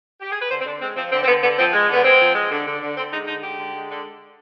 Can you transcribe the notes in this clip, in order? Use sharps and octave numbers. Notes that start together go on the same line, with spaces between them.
G4
G#4
B4
D3 C5
C4
D3 D4
G#3 C4
F3 C4
D3 C4
C4
D3 B3
D3 B3
F3 C4
G#3
D3 B3
G#3 C4
F3
G#3
D3
D3
D3
D3 C4
G#3 D#4
D3 D#4
G#3 G4
D3
G#3
D3